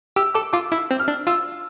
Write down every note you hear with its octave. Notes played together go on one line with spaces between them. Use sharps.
G4 E6
A4 D6
F4 D6
E4 E6
C4
F6
D4
F4 E6